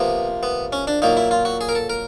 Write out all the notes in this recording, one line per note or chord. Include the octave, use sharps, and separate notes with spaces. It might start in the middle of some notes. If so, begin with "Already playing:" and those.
Already playing: C3 F3 A#3 B3
B3
C#4
D4
A#2 F#3 A#3 D#4
E4
F4
F#4
G#4
A#4
A4
A#4